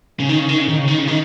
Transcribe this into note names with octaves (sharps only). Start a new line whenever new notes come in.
C#3
D#3
C#3
D#3
C#3
D#3
C#3
D#3
C#3
D#3